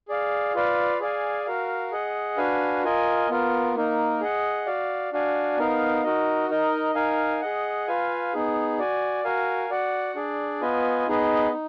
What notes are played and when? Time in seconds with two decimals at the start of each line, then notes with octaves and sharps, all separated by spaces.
0.08 G#4 D5 F5
0.54 F4 B4 D5 F5
1.00 G#4 D5 F5 G#5
1.46 F#4 A#4 F5
1.92 G#4 D#5 F#5
2.37 D4 F#4 B4 F5 G#5
2.84 F4 A#4 D#5 G#5
3.29 B3 F4 A#4
3.75 A#3 D#4 A#4
4.21 G#4 D#5 F#5
4.66 F#4 D5 F5
5.12 D4 F#4 D5 F5 G#5
5.58 B3 D#4 A#4 F5
6.03 D#4 F#4 A#4 D#5
6.49 D#4 A#4 D#5
6.95 D#4 A#4 F5 G#5
7.41 G#4 D#5 F#5
7.87 F4 B4 F5 G#5
8.33 B3 D#4 G#4
8.79 F#4 D5 G#5
9.24 F#4 A#4 F5 G#5
9.70 F#4 D5 F#5
10.15 D4 G#4 D5
10.61 B3 F4 B4 D#5 G#5
11.08 B3 D#4 G#4 B4 D#5
11.53 D#4